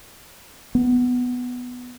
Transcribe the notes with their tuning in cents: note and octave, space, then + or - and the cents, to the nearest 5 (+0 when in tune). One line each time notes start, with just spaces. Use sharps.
B3 +5